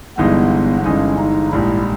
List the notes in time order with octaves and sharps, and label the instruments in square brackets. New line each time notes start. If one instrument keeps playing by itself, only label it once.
[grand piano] G1 G2 E3 G#3 D#4 [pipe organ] B3
[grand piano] G1 G2 E3 G#3 D#4 [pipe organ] C#4
[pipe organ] D#4
[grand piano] A#1 G#2 G3 [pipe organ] E4